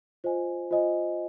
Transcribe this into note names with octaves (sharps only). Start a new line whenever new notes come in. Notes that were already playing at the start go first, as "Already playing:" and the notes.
F4 C5 D#5 G#5
F4 C5 D#5 G#5